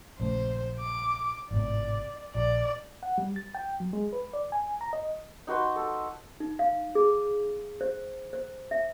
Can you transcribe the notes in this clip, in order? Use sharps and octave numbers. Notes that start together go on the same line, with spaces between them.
A#1 C#3 A3 C5
D6
G#1 A2 C3 D5
A#1 D5
F#5
G3
A6
G5
F#3
G#3
B4
D5
G#5
A#5
D#5
D#4 F#4 B4 C6
A4
D#4
F5
G#4
C5
C5
E5